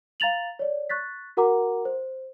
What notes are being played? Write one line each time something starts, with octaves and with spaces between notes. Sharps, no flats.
F5 A#5 A6 F7 F#7
C#5 D5
C#6 F#6 A6 B6
F#4 A#4 F#5 A#5 D6
C5